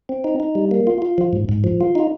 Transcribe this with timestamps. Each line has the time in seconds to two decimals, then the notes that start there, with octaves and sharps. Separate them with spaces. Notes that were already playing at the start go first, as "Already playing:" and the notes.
0.09 C4
0.24 D#4
0.40 D#4
0.55 G3
0.71 A#3
0.87 F4
1.02 F4
1.18 F3
1.33 G#2
1.49 G#2
1.64 F3
1.81 F4
1.95 D#4